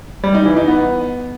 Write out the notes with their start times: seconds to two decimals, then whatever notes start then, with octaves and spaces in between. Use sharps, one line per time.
0.23 G3
0.35 D#4
0.46 E3
0.57 D#4
0.68 B3